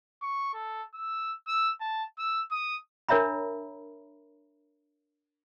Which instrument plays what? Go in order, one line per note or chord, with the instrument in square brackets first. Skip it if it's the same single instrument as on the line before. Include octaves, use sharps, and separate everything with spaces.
[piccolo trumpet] C#6
A4
E6
E6
A5
E6
D#6
[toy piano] D4 A#4 C#5 E5 A#5 B5